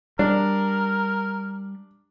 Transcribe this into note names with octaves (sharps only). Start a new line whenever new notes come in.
G3 D4 A#4